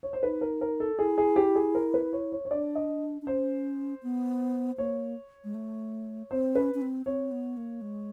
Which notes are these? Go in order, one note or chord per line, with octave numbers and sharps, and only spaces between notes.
C#5
C5
D#4 B4
A#4
A#4
A4
E4 G#4
G#4
G4
G#4
A#4
B4
C#5
C#5
C#5
D4 D5
D#5
D4
C#4 C5
B3
A#3 C#5
G#3
A3
C4 C5
C#4 B4
C#4
C4
C4 C#5
B3
A#3
G#3